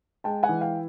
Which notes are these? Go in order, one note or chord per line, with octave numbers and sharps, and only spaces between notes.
G#3 G5 A5
F#5 G#5
E3
F5 G5